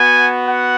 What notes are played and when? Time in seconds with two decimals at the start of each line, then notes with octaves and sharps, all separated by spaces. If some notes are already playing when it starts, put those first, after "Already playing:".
Already playing: B3 F#4 G#5
0.47 F#5